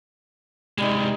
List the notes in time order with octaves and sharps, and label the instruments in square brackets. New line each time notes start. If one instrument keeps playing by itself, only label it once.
[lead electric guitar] C3 G#3 [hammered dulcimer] G3 D#4